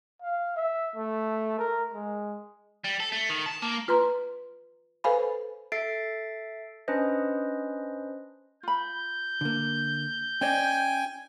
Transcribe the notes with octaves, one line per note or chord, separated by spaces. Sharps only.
F5
E5
A3
A#4
G#3
G3
A4
A3
D#3
A5
A#3
F4 B4 A#5 C6
A4 B4 C5 F5 G#5 B5
A4 E5 A6 C7 D7
C#4 D4 B4 C5 D#5
F4 B5 G6
D3 A#3
C#4 C5 D5 D#5 G5 G#5